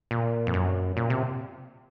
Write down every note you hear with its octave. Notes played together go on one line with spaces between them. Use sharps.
A#2
F2
F#2
A#2
C3